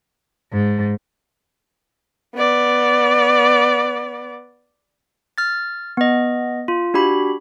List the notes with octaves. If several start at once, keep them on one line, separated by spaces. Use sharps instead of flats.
G#2
B3 D5
F6 A6
B3 D#5
F4
D4 F#4 G4 B5